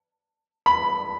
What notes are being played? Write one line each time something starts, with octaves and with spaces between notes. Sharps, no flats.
B5